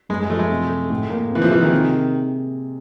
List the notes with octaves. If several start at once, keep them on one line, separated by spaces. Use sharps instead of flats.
F#2 G#3
G#3
F3 A3
G#3
C3
A3
A2
A#3
C3 E3
F3
E3 G#3
D#3
C3